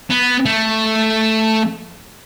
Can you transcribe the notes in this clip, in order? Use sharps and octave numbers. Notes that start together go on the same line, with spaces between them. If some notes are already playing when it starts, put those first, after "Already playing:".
B3
A3